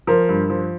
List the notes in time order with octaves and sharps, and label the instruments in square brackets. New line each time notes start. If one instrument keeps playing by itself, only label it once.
[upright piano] F3 [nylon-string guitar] A#4
[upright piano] G2
F3